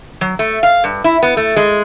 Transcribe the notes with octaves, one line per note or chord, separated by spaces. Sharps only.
F#3
A3
F5
G2
E4
B3
A3
G#3